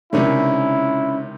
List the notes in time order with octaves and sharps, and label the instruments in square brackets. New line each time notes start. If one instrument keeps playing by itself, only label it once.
[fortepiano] C#2 C3 D#3 [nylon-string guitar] C#4 D4 C#5 [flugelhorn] E4